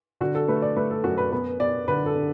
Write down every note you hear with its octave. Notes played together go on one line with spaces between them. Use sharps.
D3 F#4
A4
A3 B4
D5
A3 B4
A4
F#2 F#4
B4
B3 B4
B3 D5
D3 B4
A4
D3